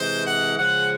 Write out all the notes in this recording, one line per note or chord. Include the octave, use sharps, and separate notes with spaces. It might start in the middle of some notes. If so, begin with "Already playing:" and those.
Already playing: C3 E3 G#3 C5
F#5
C#3 F3 G#3 F#5